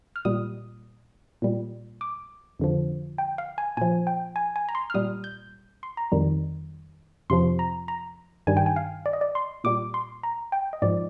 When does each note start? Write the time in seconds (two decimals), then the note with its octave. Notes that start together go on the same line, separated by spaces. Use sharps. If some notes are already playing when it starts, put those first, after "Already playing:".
0.16 F6
0.25 A#2 G3 D#6
1.42 A#2 G3
2.01 D6
2.59 F2 D3 F3
3.18 G5
3.38 F5
3.58 G#5
3.77 A#2 F3 G#5
4.07 G5
4.36 G#5
4.56 G#5
4.69 A#5
4.75 C6
4.90 F6
4.94 A#2 G3 D#6
5.24 G6
5.83 C6
5.97 A#5
6.12 F2 D#3 G3
7.30 F2 C3 F3 C6
7.59 A#5
7.88 A#5
8.47 G2 D#3 G3 G#5
8.57 G5
8.66 G#5
8.76 F5
9.06 D5
9.13 D#5
9.21 D5
9.35 C6
9.64 A#2 G3 D6
9.94 C6
10.23 A#5
10.52 G5
10.73 D#5
10.82 G#2 F3 D5